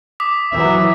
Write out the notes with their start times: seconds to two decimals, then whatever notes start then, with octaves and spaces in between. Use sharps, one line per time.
0.20 D6 D#6 B6
0.52 E3 F#3 E5